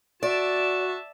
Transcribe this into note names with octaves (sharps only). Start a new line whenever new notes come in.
F#4 D5 E5 A5